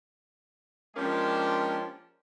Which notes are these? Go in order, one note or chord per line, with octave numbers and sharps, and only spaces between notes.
F3 G#3 A#3 C#4 D4 G4